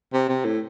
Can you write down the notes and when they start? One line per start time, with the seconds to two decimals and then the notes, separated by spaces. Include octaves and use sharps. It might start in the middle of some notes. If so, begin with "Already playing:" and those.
0.13 C3
0.29 C3
0.45 A2